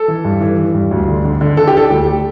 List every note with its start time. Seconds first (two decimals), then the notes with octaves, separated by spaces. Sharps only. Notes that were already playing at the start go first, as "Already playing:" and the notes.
Already playing: A4
0.08 E3
0.25 G2
0.41 E3
0.58 E3
0.74 G2
0.91 D2
1.08 D3
1.24 D3
1.41 D3
1.57 D3 A4
1.68 G4
1.74 D3 A4
1.90 D2 G4